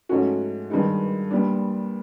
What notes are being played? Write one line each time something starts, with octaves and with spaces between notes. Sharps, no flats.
G#2 F3 A3 C#4 F#4
G2 D#3 G#3 B3 D#4
A#2 G3 B3 D4